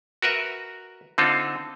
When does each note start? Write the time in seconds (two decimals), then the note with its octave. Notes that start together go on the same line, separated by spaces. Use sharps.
0.22 F#4 A#4 B4 E5
1.18 D3 C4 D#4 F4 A4